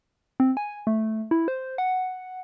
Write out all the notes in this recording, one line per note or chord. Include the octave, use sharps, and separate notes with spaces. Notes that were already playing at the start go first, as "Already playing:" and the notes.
C4
G#5
A3
E4
C5
F#5